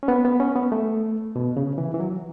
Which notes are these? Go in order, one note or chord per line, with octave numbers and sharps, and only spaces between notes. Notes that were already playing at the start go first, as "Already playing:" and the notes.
C#4
B3
B3
C#4
B3
A3
B2
C#3
E3
E3
F#3